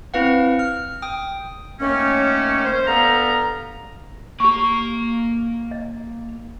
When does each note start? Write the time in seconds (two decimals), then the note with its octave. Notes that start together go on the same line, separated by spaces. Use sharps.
0.14 C4 E4 B4 F5 F#5
0.59 F6
1.02 G5 D#6
1.80 D#3 A3 A#3 C#4
2.64 C5
2.87 G2 B3 A4 F5 A#5
4.40 A#3 G4 A#5 C#6
5.71 D#5